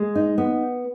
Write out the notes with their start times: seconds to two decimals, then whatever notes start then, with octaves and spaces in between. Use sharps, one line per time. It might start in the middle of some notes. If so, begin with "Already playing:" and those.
Already playing: G#3
0.15 D#4
0.38 B3